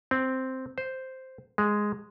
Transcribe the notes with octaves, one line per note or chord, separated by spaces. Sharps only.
C4
C5
G#3